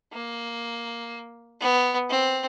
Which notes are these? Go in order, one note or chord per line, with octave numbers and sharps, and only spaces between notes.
A#3
B3
C4